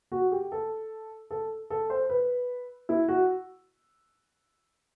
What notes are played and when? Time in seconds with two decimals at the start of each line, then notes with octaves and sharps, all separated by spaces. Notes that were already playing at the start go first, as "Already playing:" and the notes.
0.12 F#4
0.32 G4
0.52 A4
1.31 A4
1.70 A4
1.90 C5
2.10 B4
2.89 E4
3.08 F#4